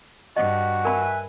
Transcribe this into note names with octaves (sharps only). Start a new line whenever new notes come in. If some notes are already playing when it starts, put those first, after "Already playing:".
G2 F#4 D#5
A#4 B4 E5 G#5 B5